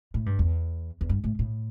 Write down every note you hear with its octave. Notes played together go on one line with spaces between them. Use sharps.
A2
G2
E2
E2
G2
A2
A2